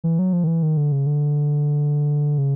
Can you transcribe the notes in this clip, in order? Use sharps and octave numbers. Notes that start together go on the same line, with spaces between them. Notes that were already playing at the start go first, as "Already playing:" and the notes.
E3
F#3
F3
D#3
E3
D#3
D3
C#3
D3
C#3